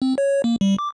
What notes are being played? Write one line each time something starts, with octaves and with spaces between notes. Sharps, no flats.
C4
C#5
A#3
G3
D6